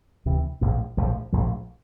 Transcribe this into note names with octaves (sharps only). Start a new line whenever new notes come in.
D2 C3 E3
A#1 A2 F3
A#1 A2 F3
A#1 A2 F3